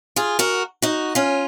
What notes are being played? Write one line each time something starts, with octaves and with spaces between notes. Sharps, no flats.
F4 G#4
F#4 A#4
D#4 F#4
C#4 F4